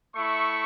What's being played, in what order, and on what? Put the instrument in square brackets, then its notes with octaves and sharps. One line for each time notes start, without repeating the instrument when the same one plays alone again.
[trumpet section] A3 E4 C#6